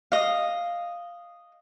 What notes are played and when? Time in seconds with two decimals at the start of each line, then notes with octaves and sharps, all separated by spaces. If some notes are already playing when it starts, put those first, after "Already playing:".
0.12 D#5 F5